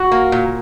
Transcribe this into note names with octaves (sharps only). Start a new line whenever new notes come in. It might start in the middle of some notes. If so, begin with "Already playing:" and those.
Already playing: F#4
A#3
A#2